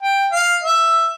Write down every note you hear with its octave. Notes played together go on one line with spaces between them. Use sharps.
G5
F5
E5